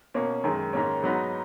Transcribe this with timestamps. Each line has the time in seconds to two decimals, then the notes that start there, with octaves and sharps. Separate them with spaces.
0.14 B2 A#3 C#4
0.44 F#2 D#3 G#3
0.73 G#2 D#3 A#3 C#4
1.03 G#2 F#3 B3 D#4